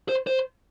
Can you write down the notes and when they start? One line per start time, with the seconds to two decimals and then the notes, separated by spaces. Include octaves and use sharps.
0.09 C5
0.27 C5